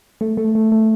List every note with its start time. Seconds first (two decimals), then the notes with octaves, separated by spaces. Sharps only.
0.21 A3
0.37 A3
0.55 A3
0.72 A3